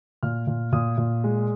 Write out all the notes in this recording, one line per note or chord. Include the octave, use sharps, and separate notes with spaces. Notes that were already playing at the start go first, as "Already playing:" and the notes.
A#2 F6
A#2
A#2 D#6
A#2
G#3